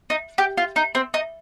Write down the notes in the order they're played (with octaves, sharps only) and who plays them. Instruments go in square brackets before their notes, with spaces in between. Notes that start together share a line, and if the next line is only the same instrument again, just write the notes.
[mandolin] D#4
G4
F4
D#4
C4
D#4